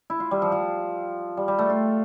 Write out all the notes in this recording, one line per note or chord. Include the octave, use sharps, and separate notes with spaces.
E4
F4
G3
F3
F3
G3
G3
A3
F4